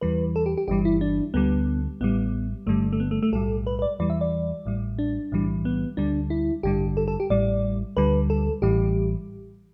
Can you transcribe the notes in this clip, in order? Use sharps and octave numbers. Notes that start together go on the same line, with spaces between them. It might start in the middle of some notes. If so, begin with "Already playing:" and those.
E2 E3 G3 B4
A4
G4
G4
G1 G2 E3 G3 G4
E4
D4
D2 D3 G3 B3
A1 A2 G3 B3
G1 G2 D3 G3 A3
A3
B3
A3
A3
B1 A2 G3 A4
B4
B4
D5
E2 E3 G3 D5
E5
D5
A1 A2 G3
D4
B1 A2 E3 G3
B3
D2 D3 G3 D4
E4
A1 G2 D3 G3 G4
A4
A4
G4
A1 A2 G3 D5
D2 D3 G3 B4
A4
A1 A2 E3 G3 G4